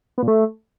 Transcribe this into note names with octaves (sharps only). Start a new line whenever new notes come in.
B3
A#2
A3